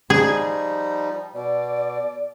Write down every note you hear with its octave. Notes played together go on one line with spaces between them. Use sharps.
F3 G3 D#4 G#4
B2 D5